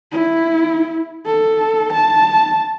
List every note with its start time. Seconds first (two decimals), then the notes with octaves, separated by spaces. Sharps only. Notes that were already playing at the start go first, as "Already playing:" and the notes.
0.12 E4
1.26 A4
1.93 A5